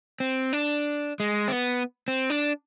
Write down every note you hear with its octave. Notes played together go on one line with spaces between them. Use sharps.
C4
D4
G#3
C4
B3
C4
D4